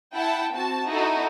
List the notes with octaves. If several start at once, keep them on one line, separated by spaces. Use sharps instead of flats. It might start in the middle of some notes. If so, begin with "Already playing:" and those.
E4 F#5 G5 A5
C4 F#4 A5
D#4 E4 F#4 A4